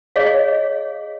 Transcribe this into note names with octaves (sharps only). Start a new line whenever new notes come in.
G#4 C#5 D#5 F5